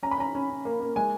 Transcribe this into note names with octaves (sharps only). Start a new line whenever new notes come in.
C#4 A#5
B5
C#4 A#5
C#4
C#4
A#3
A#3
G#3 G#5